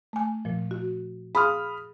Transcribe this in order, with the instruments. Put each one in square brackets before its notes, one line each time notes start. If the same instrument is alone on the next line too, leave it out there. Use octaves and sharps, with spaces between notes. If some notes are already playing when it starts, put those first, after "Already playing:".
[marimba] A3 G#5
A#2 F3
F#4
[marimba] G#4 F5 C6 [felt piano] B5 D#6 F6